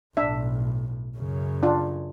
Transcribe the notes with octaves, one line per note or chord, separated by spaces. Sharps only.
B1 A2 D4 E5
F#2 C#3
D4 F4